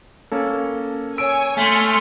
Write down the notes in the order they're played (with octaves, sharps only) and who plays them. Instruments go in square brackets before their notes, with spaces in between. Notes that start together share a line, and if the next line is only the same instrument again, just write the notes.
[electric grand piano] A#3 C#4 A4
[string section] C#5 G#5 [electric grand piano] E6 D7
[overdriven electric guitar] A3 [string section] G#5 C6 F6